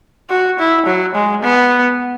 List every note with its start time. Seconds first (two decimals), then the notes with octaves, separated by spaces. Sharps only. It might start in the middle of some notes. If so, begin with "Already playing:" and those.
0.30 F#4
0.59 E4
0.86 F#3
1.14 G#3
1.42 B3